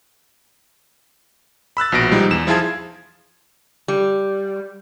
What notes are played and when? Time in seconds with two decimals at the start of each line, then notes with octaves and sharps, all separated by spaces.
1.77 B5 E6 F#6 A6
1.92 A#1 B2 A#6 D7
2.11 F3 G3 G#3 D#4
2.31 E2 E7
2.47 F3 E4 F4 G#4 A5 G#6
3.88 G3